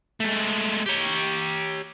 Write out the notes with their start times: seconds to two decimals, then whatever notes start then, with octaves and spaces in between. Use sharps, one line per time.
0.20 G#3 A3
0.86 G4 C#5